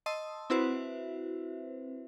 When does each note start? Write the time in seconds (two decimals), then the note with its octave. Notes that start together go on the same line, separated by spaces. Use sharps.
0.06 D#5 A5 C6 D#6 E6
0.50 C4 E4 F#4 B4 C5 E5